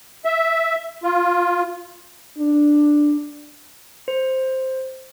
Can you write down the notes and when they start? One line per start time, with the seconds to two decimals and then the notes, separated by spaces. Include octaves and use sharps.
0.25 E5
1.04 F4
2.38 D4
4.08 C5